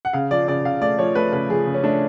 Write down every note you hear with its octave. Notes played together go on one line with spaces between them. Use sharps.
F#5
C#3 F5
F3 D5
C#3 D5
C#3 F5
A3 D5
F3 C#5
A3 B4
C#3 B4
F3 G#4
C#3
C#4
A3 D4